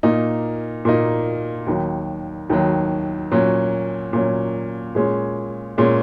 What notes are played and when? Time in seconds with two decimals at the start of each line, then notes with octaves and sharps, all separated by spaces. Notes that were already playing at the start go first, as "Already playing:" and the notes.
0.03 A#2 A#3 D#4
0.85 A#2 A#3 D#4
1.66 D#2 D#3 F#3
2.50 D#2 D#3 F#3
3.31 A#2 F#3 C#4
4.13 A#2 F#3 C#4
4.95 A#2 G#3 C#4
5.78 A#2 G#3 C#4